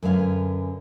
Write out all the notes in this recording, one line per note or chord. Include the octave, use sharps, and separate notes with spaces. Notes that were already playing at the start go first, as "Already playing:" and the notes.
F#2 D3 B4 F5 G#5